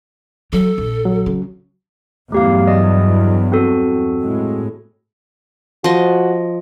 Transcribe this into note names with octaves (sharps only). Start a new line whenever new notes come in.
F#3 A4
A#1
F#3
C#3
E2 G2 F#3 A3 G4 F5
D5 D#5 D#6
C4 F#4 A4
A2 G#3
F3 F#4 D#5